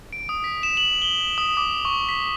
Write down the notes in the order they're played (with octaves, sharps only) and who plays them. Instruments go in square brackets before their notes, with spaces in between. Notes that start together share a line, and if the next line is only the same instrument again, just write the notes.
[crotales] D7
D#6
B6
E7
F#7
G7
D#6
D6
C#6
B6